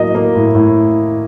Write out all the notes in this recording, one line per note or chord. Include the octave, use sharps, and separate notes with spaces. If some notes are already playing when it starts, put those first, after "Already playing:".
Already playing: A2 F#3 A#3 D#5
A#3
A2
A2